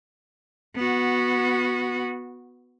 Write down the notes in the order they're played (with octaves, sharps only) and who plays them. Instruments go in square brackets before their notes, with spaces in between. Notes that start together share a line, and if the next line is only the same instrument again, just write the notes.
[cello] B3 F#4